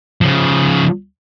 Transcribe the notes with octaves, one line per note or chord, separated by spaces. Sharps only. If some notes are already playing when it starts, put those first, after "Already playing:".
C#3 F3